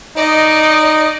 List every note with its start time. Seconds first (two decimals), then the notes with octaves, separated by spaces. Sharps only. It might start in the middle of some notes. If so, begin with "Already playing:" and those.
0.16 D#4 D5 D#5